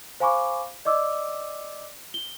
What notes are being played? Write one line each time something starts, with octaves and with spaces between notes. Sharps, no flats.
C5 F5 G#5 B5 C#6 D6
D5 D#5 D6 E6
G7